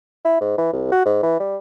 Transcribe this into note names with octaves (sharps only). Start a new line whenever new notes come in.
E4
G#2
E3
C2
F#4
G#2
E3
G3